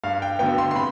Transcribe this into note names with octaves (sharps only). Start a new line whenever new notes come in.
G2 F5
G5
D3 F#3 B3 G5
C6
C6
C3 B5